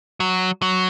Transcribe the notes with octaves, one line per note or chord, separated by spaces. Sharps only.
F#3
F#3